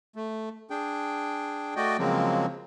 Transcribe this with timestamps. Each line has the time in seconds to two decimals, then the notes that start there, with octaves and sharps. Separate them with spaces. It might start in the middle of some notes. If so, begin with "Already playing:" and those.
0.16 A3
0.70 D4 G#4 G5
1.76 A3 F#4 D5 D#5 G5
1.99 C#3 F3 F#3 G#3 A#3 C4